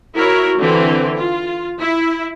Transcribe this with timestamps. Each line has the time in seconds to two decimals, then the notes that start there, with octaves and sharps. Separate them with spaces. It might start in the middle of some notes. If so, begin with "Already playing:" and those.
0.15 E4 F#4 A#4 C#5
0.58 D3 E3 C4
1.17 F4
1.80 E4